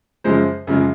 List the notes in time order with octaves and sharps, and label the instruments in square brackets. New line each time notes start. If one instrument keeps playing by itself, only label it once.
[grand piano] F#2 C#3 F3 G#3 C5
F#2 C#3 F3 G#3